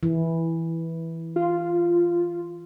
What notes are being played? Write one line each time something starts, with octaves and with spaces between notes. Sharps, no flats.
E3
F4